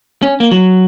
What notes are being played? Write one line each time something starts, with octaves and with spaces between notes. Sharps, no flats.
C#4
A#3
F#3